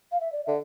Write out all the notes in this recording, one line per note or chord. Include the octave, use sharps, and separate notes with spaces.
F5
E5
D5
D3 E5